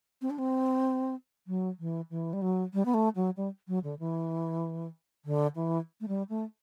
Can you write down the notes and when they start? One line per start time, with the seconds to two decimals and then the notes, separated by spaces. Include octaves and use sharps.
0.22 C4
0.30 D4
0.38 C4
1.47 F#3
1.79 E3
2.10 E3
2.33 G3
2.42 F#3
2.74 G3
2.85 B3
2.94 A3
3.15 F#3
3.37 G3
3.68 F#3
3.84 D3
3.99 E3
5.25 D3
5.56 E3
6.01 A3
6.08 G3
6.29 A3